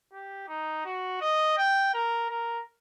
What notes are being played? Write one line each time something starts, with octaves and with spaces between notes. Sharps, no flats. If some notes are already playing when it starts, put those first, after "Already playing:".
G4
D#4
F#4
D#5
G5
A#4
A#4